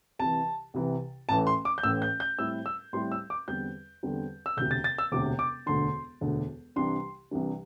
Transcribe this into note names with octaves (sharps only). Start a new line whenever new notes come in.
C2 C3 E3 A5
C2 C3 E3
A1 A2 E3 A3 A5
C6
D6
G6
A1 A2 E3 A3 E6
G6
G6
A2 G3 C4 E4 E6
E6
A2 G3 C4 E4 C6
E6
D6
E2 D3 G3 C4 G6
E2 D3 G3 C4
E6
E1 D2 C3 G6
A6
A6
E6
E1 D2 C3 D6
D6
E1 D2 D3 C6
E1 D2 D3
C2 C3 E3 G3 D4 C6
C2 C3 E3 G3 D4